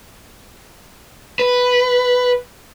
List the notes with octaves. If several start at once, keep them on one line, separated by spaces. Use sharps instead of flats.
B4